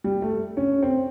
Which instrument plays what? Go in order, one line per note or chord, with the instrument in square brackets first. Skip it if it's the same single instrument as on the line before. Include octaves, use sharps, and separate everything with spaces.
[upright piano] G3
A3
C#4
C4